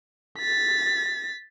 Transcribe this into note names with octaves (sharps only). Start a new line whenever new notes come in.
A6 B6